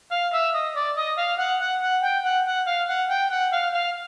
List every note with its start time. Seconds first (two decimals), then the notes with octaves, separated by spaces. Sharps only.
0.12 F5
0.34 E5
0.55 D#5
0.76 D5
0.97 D#5
1.18 F5
1.39 F#5
1.61 F#5
1.82 F#5
2.03 G5
2.25 F#5
2.47 F#5
2.67 F5
2.89 F#5
3.10 G5
3.31 F#5
3.53 F5
3.74 F5